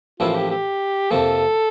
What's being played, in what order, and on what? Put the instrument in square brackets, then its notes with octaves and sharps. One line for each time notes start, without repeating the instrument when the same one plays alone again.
[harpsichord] A1 A2 F3 A#3 E4 [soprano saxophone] F4
[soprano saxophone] G4
G4
[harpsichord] F2 C3 F3 A#3 [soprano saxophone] A4